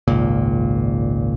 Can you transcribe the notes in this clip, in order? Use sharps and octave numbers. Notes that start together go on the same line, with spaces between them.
G#1 C#2 A#2